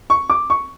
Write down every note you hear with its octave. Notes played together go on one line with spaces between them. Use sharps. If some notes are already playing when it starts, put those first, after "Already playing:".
C#6
D6
C#6